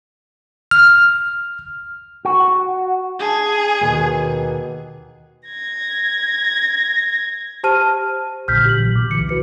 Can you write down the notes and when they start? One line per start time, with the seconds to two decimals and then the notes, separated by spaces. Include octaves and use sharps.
0.71 F6
2.25 F#4
3.19 D4 G#4
3.81 D#2 B2 D#3
5.47 G#6 A#6
7.64 G4 C5 A5 F6 D#7
8.48 B1 A#2 D3 F6 G6 B6
8.66 G4 F#7
8.78 A#2 E3 F#3
8.96 B2 D6
9.11 C2 D3 E3 C#7
9.29 F#4 B4 C#7